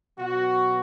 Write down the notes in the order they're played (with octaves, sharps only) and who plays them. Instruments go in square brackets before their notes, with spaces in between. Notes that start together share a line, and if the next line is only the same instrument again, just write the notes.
[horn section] B2 F#3 F#4